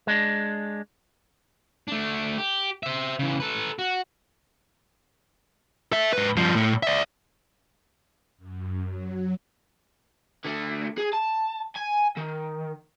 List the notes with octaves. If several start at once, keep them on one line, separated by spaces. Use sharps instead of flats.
G#3 D4
A3 D4
G4
C5 E5
C#3 E3
A4 B4
F#4
A4 E5
G#2 B4
G2 F3
A2
D5 E5
F#2
F#3
D3 A3
G#4
A5
G#5
D#3